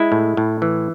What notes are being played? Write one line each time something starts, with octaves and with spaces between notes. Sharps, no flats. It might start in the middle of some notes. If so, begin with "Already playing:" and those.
Already playing: G#3 E4
A2
A2
E3